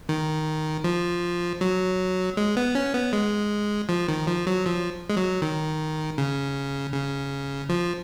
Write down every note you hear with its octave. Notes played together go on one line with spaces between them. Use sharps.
D#3
F3
F#3
G#3
B3
C#4
B3
G#3
F3
D#3
F3
F#3
F3
G#3
F#3
D#3
C#3
C#3
F3